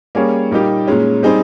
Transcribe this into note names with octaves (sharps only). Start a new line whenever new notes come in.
G3 A#3 C#4 G#4 C#5
A#2 G3 A#3 D#4 G4
A#2 G#3 C#4
G3 C4 D#4 G#4 C5